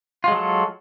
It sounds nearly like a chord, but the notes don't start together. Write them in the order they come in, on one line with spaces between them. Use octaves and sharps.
F4 G#3 F#3 A4